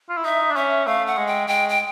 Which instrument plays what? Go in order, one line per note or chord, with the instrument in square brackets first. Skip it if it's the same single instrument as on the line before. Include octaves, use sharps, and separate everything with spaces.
[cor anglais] F4
E4
[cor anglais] D#4 [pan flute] E5
[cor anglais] D4
[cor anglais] C#4 [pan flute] E5
[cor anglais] A3 [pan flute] F5
[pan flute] F#5
[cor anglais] G#3
[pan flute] G5
[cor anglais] G#3 [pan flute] G5
[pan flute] G5